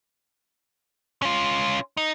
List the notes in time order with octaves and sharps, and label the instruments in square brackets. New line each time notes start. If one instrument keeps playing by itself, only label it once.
[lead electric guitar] C#4 F4
D#4